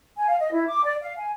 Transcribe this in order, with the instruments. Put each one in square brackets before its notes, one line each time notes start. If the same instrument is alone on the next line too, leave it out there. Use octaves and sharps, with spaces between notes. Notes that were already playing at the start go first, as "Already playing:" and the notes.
[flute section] G#5
F5
D#5
E4
D6
D5
F5
G#5